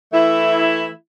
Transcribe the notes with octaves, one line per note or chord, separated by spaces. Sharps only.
E3 A3 E4